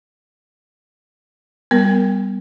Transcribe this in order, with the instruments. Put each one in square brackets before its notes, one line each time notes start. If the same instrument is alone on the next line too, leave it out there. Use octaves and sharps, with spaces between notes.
[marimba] G3 A#4 [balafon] B3